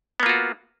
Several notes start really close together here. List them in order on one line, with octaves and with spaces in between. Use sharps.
B3 A#3 F4 F#4